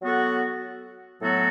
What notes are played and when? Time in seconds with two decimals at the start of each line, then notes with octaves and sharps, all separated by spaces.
0.02 F#3 B3 F#4 A4
1.21 A2 F#3 B3 F#4 A4